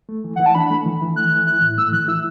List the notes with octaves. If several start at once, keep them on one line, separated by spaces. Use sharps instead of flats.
A3
E3
E3 F#5
A5
D4 B5
A3
E3
E3
A3 F#6
E3
E4 F#6
A2
A3 E6
E3 F#6
E4 E6